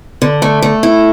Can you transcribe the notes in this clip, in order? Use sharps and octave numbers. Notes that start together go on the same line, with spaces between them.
D3
A3
A3
E4